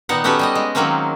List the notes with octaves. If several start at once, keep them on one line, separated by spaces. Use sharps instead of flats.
A#2 D#3 B3 D#4 F#5
B3 C#4 F#4 G4 A4 B4
G3 G4 D#5
G#3
D#3 F#3 G#3 A#3 C4 C#4